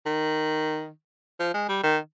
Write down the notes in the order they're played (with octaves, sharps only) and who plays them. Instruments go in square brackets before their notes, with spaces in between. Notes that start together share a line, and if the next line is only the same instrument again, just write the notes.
[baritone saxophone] D#3
F3
G#3
G3
D#3